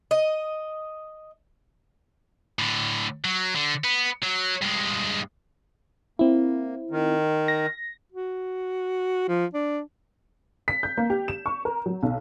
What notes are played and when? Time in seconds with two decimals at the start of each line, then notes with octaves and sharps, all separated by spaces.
0.11 D#5
2.59 A2 D3
3.25 F#3
3.55 D3
3.84 B3
4.22 F#3
4.62 G2 G#3
6.19 A#3 C4 E4
6.91 D#3
7.48 A#6
8.12 F#4
9.29 F3
9.54 D4
10.68 B6
10.83 G6
10.97 A#3
11.10 G4
11.28 E7
11.46 C#6
11.65 A#4
11.86 F#3
12.03 B1